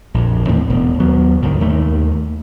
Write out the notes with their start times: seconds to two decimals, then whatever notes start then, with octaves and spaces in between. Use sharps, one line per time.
0.14 A#1 F2
0.47 D#2 A2 E3 C4
0.69 E1 B2
0.99 D#2 F#3 B3
1.42 C2 G#2 D3 D#3
1.61 D#2 D#3 A3